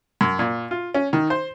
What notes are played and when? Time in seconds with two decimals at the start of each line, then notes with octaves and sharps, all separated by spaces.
0.21 F#2
0.39 A#2
0.71 F4
0.94 C#4
1.13 D#3
1.30 C5